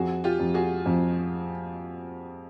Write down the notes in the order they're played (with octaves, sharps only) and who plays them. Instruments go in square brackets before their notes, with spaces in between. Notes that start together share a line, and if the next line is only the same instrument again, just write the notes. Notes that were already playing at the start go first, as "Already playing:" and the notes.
Already playing: [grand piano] F2 [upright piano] F#4 G#4
[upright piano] F4 G4
[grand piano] F2
[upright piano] F#4 G#4
[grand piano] F2